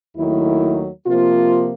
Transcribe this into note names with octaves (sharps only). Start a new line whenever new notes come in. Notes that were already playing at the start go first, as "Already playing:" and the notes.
D#2 D#3 F#3 A3 E4
C3 F3 A#3 F4